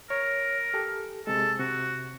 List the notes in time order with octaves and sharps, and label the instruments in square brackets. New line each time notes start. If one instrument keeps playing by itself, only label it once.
[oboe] A#4 [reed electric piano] C#5
[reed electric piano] G4 A4
[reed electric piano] C3 G#3 [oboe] A4
[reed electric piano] C3 [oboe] F#4